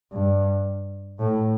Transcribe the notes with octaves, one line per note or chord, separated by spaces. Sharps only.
G2
A2